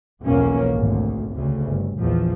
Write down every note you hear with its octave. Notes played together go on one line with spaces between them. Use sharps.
B1 E2 F3 A#3 C#4
G#1 D2
D2 C#3
G1
A#1 E2 F3